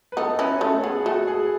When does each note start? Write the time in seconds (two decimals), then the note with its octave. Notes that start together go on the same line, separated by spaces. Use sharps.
0.12 B4
0.17 B3 D#4 A4
0.39 C#4 E4 B4
0.61 A3 C#4 A4
0.84 B3 G#4
1.05 A3 F#4
1.27 G#4